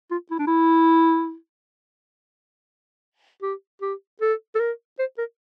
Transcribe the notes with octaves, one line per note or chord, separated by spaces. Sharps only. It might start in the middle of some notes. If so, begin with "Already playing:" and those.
F4
E4
D4
E4
G4
G4
A4
A4
A#4
C5
A#4